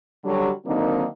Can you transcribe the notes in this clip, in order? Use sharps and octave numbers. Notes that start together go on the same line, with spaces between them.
D3 F#3 G3
D3 D#3 F#3 A#3 C4 D#4